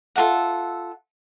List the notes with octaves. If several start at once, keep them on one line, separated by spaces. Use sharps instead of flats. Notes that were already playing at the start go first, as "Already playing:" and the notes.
F4 A4 E5 F#5